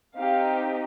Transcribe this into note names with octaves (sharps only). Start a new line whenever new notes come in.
C4 D#4 G4 F5